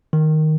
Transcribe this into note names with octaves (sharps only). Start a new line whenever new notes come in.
D#3